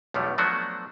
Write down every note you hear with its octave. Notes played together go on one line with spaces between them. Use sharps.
B1 E2 F3 G3 A3
F3 F#3 A3 B3 D4 F#4